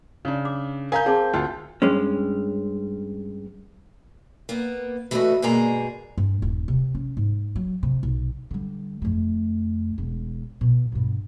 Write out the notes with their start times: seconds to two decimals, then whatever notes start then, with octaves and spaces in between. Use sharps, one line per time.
0.25 C#3 D4
0.45 D6
0.92 A#4 F5 G#5 A#5 G6
1.06 C4 G#4 A5 D6
1.34 D2 F4
1.82 G2 G#3 C#4
4.49 A#3 B3
5.11 E3 A3 F#4 G4 A4 D#5
5.42 G2 B2 G#3 A#3 G#4 A#5
6.18 G2
6.42 D#1
6.68 C3
6.95 C#4
7.17 G#2
7.56 F#3
7.83 C3
8.03 B1
8.51 D3 G3
9.02 F2 A3
9.98 E1
10.61 B2
10.92 G2 B2